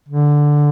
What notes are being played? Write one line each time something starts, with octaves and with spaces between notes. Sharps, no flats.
D3